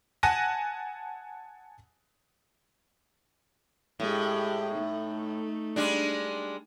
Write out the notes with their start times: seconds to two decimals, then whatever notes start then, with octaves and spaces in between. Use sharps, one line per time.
0.23 F#5 G#5 A5 F#6 A#6 D#7
4.00 A2 G#3 G4
4.73 A3 D#4
5.76 G3 G#3 D4